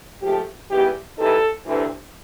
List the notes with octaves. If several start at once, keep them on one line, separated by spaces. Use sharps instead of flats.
G#2 F3 A3 G4
G#2 E3 G3 B3 G4
C3 E3 G3 C4 D#4 A4
D2 C3 E3